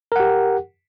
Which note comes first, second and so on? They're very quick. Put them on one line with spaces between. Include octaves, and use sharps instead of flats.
A#4 F#5 G4